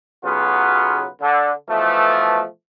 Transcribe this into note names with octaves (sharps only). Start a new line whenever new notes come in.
B1 C#3 F#3 B3 F4 B4
D3
B2 E3 F3 A3